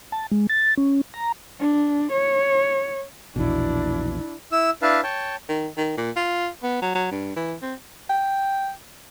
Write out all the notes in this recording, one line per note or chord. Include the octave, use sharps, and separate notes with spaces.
A5
G#3
A6
C#4
A#5
D4
C#5
A#1 E2 B2 D4 E4
E4 E6
D4 E4 B4 F5 A5
C#5 G5 A5
D#3
D#3
A#2
F4
B3
F#3
F#3
G2
E3
C4
G5